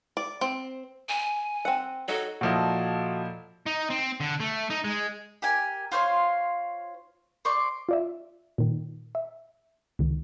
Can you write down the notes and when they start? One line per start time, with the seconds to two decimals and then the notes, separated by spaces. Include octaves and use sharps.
0.17 D5
0.41 C4
1.09 G#5
1.65 C4 F#5
2.08 D#4 F#4 A4 C#5
2.41 A#2 F3 E4 F#4 A4 D#5
3.66 D#4
3.90 C4
4.20 D3
4.40 A3
4.70 D#4
4.85 G#3
5.42 G4 A#4 G#5
5.92 F4 C5 C#5 F5
7.45 C5 D5 C#6
7.89 F4 D5 E5
8.58 A#2 D#3
9.15 E5
9.99 C#2 D#3